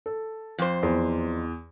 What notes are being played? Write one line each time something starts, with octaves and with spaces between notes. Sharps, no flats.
A4
F2 C5
E2